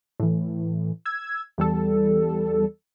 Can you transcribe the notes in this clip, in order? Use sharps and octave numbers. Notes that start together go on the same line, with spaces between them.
A2 E3
E6 G#6
E2 G3 A4